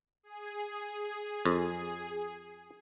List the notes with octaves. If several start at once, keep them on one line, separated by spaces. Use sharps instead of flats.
G#4
F2